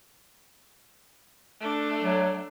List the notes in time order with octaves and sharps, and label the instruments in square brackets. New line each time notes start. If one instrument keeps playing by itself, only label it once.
[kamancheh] A3 D4
[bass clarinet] F#3